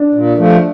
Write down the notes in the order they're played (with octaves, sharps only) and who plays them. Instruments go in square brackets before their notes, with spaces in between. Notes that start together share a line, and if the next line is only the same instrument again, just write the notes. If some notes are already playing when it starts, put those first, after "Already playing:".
Already playing: [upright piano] D4
[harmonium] A#2
F3 A3